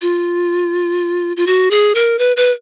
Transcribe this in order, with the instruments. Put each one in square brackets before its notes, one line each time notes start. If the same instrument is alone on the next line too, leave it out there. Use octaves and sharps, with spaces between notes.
[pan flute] F4
F4
F#4
G#4
A#4
B4
B4